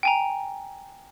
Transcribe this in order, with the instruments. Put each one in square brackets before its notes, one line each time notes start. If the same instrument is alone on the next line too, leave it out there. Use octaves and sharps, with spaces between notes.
[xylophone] G5 G#5 A#5